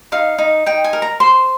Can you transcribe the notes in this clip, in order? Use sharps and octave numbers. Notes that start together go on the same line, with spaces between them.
D#4 F5
D#4
D#4 G5
G#5
A#4
A#5
C5 C6